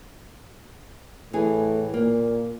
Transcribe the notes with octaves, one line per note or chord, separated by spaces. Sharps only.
A2 E3 G#4
A#2 A#3